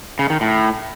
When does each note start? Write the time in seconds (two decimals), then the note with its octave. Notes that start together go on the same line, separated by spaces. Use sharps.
0.19 C#3
0.30 D#3
0.41 A2